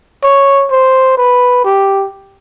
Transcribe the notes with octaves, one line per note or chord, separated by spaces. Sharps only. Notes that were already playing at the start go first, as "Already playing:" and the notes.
C#5
C5
B4
G4